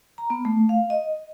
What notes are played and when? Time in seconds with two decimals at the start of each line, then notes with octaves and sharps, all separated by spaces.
0.18 A#5
0.30 B3
0.45 A3
0.69 F5
0.90 D#5